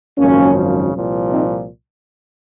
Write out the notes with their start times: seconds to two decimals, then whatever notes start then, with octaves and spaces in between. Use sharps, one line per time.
0.18 G#1 F#2 C#3 F3 A#3 C#4
0.94 C2 A#2 F3
1.32 C4 D#4